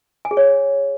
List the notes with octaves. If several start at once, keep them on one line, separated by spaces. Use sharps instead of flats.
G#5
G#4
C#5